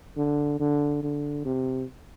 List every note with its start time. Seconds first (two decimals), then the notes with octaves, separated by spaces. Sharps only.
0.17 D3
0.60 D3
1.03 D3
1.45 C3